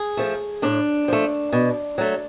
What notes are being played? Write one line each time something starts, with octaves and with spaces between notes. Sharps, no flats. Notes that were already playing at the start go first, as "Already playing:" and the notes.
Already playing: G#4
F3 A3
A2 D4
F3 A3
B2
F#3 A3